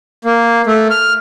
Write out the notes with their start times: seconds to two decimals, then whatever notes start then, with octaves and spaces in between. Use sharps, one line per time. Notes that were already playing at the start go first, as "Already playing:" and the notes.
0.25 A#3
0.67 A3
0.90 F6